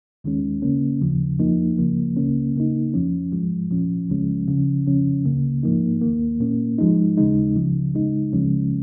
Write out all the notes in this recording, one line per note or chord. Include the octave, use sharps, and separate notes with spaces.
D#2 D#3 G#3 C#4
C#3 A#3 C#4
D#2 C#3 F3
F2 F3 A#3 D#4
C#2 C#3 F3 A#3
C#2 C#3 A#3 C#4
C#3 A#3 D#4
F2 F3 C#4
G#2 F3 G#3
A#2 F3 C#4
C#2 C#3 F3 G#3 C#4
C#3 F3 C#4
F2 C#3 F3 C#4
C#2 C#3 A#3
G#2 F3 A#3 D#4
D#2 D#3 A#3
A#2 A#3 C#4
G#2 F3 G#3 D#4
D#2 C#3 G#3 D#4
C#2 C#3 F3
C#3 G#3 D#4
C#2 C#3 F3 G#3 C#4